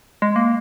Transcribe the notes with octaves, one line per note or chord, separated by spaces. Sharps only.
G#3
A#3